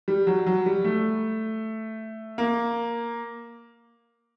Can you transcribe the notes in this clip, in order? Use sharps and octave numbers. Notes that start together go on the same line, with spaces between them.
G3
F#3
F#3
G3
A3
A#3